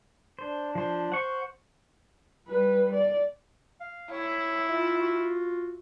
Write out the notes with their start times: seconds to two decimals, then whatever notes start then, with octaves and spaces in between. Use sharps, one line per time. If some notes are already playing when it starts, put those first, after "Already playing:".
0.39 D4 C5
0.75 F3 D4 C5
1.12 C5 F#5 C#6
2.48 G3 B4
2.94 D5
3.81 F5
4.11 E4 C#5
4.69 F4 E5
5.00 F#4